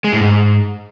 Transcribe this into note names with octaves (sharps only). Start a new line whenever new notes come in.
G#3
A2
G#2